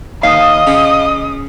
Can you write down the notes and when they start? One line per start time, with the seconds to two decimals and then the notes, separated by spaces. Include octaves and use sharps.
0.23 D#2 D#5 F5 D#6
0.67 C#3